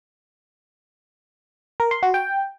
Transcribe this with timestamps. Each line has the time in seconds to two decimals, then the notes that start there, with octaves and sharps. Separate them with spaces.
1.80 A#4
1.91 C6
2.03 F#4
2.14 G5